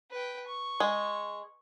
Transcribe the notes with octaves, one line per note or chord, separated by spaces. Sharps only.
B4 G5
C#6
G#3